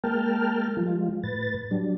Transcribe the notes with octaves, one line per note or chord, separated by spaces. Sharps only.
G#3 A#3 A#4 G5 A5 F6
F3 G3 G#3 F4
A2 B4 A6
F#3 G3 D4